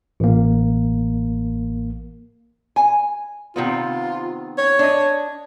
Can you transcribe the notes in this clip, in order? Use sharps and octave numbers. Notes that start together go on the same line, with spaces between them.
A1 A#3
G#5
C3 D#3 B3 F4
C#5
D4 D#5